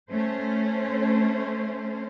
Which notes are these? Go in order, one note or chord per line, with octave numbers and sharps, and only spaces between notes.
A3 C#4 C5